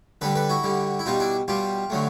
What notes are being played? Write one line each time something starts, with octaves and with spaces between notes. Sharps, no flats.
D3 G3 A4 B4
A4 B4
E4 F#4
D3 G3
E4
B2 G3 D#4 F4
D4 E4
B2 G3 F4 G4
D3 F#3 A3